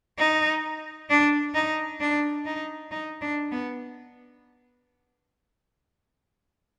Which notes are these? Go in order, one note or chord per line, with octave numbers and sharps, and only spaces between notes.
D#4
D4
D#4
D4
D#4
D#4
D4
B3